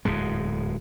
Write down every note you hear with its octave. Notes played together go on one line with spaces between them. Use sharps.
D1 E2 G#2 G#3